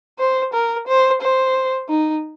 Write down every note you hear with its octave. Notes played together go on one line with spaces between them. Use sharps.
C5
A#4
C5
C5
D#4